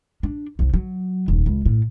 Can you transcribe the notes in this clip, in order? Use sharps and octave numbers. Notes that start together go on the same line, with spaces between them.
D4
C2 C3
F#3
D#1 C2
C#2
A2